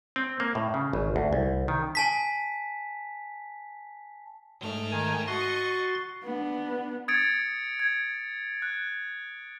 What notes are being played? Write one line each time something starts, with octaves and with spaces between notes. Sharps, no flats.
C4
A#3
A2
C#3
G#1
D2
C2
D#3
G#5 A5 B6
G#2 A3 F6
D#3 G#5
F#4 D#5 C6 C#6 A6
B3 D4
D#6 G#6 A6 C#7 D7
G#6
F#6